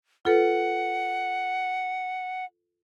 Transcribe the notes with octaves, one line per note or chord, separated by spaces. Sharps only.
F4 A4 B4 F#5